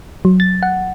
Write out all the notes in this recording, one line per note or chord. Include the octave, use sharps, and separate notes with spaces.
F#3
A6
F#5